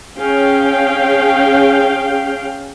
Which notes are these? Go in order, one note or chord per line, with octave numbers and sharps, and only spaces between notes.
C#4 G#4 F5 G5